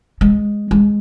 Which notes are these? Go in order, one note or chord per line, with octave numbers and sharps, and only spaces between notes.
G#3
G#3